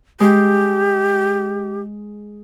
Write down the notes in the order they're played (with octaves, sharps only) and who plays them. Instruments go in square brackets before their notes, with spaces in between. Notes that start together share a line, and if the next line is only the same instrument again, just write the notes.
[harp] G#3 [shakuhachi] G4